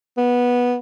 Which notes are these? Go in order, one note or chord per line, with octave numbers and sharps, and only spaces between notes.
B3